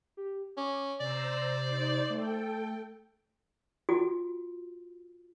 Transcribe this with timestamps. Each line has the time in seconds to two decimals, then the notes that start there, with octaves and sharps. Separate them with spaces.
0.17 G4
0.57 C#4 D6
1.00 C3 C5 D5 A#5 E6
1.60 D#4 C5
2.10 A3 A4 G5
3.89 F4 F#4